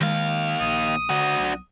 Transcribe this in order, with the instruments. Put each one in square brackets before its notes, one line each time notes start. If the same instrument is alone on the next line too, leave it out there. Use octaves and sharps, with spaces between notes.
[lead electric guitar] D#2 F5 [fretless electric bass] D#3 G#3
[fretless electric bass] A#1 [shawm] D#6
[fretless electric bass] D3 [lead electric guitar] D4 F#4
[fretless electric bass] B1